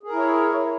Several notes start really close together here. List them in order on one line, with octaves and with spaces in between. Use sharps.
G#4 A#4 E4 C#5